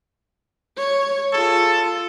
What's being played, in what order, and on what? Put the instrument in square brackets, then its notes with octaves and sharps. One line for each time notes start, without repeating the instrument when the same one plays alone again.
[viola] C#5
[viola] F4 G#4 [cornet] A4